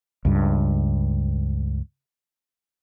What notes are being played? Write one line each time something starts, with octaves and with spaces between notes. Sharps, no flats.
C#2 G2